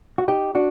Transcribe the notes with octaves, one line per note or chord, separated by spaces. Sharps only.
F#4
D#4 G4
D4 F#4